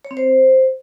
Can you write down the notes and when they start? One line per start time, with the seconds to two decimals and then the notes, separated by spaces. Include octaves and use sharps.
0.05 C#5
0.11 C4
0.17 C5